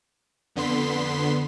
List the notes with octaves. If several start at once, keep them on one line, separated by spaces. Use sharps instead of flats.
F2 D3 B3 C6 B6